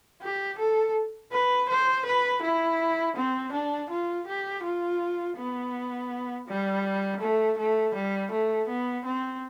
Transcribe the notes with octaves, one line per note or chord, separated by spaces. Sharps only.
G4
A4
B4
C5
B4
E4
C4
D4
F4
G4
F4
B3
G3
A3
A3
G3
A3
B3
C4